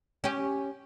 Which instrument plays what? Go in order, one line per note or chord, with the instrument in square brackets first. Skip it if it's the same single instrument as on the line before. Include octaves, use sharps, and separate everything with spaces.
[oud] C#4 G4